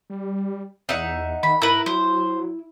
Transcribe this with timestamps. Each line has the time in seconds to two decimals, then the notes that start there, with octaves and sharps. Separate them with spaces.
0.10 G3
0.89 E2 D#4 E5 F#5
1.43 D#3 B5
1.62 G#2 E4 A#4 B4
1.86 F#3 C5